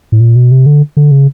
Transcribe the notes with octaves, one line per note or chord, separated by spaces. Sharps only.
A2
A#2
B2
C3
D3
D3
C#3